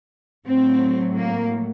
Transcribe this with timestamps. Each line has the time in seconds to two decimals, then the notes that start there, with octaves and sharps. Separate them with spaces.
0.45 A2 F#3 C4
1.18 A#3